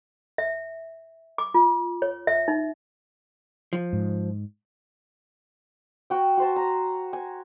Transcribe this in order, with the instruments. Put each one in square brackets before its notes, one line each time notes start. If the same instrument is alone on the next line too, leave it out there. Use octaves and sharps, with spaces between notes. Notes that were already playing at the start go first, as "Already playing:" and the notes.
[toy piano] E5
D6
F4
C#5
E5
D#4
[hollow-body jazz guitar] F3
[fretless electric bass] G#2
[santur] F#4 G5
F#4 C5 A5
A#5
G#5